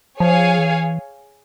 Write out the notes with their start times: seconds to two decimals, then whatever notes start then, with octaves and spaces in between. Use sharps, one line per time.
0.20 F3 G#4 C#5 F5 G#5
0.59 E3